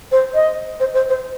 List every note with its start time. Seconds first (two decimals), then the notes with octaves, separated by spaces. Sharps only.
0.12 C5
0.34 D#5
0.80 C5
0.94 C5
1.09 C5